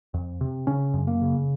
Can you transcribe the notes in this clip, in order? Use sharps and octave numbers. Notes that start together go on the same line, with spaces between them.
F2
C3
C#3 C#4
F#2
A#3
C#3